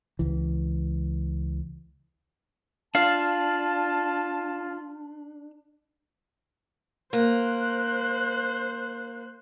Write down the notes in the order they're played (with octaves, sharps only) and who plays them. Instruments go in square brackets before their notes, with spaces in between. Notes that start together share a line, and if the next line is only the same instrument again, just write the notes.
[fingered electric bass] C#2 E3
[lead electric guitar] D4 [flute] F4 [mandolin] F5 [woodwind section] A5
[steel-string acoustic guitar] A#3 [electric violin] C5 F#6